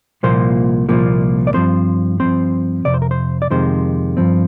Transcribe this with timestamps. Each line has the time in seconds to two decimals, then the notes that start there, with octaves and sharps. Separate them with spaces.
0.23 C2 A#2 F3 A#3 C5
0.89 C2 A#2 F3 A#3
1.47 D5
1.54 G2 F3 C4 C5
2.20 G2 F3 C4 C5
2.85 F2 C3 D5
2.94 C5
3.02 A#4
3.11 C5
3.42 D5
3.50 F2 C3 D#3 G#3 C5
4.17 G2 F3 C4